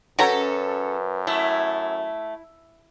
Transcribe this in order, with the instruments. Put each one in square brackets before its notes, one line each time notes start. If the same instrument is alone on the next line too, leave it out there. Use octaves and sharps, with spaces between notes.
[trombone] F#2 [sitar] C#4 A4 C#5 [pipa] F#4 G5 A#5 [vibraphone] B4
[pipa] A3 [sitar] E4 [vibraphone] E5